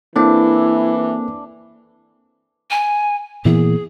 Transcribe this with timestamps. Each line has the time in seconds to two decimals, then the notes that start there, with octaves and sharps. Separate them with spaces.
0.16 E3 A#3 C4 D4 E4 A4
2.71 G#5
3.45 A#2 E3 B3 G#4